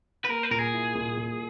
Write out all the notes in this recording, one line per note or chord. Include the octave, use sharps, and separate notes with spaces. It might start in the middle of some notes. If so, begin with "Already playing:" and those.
B4
A#3 A#4
B4
A#2 A#4
G#4
E4
A#2
A#2